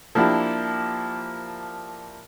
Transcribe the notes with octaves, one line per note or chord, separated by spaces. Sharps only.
F3 A#3 D4 E4 G4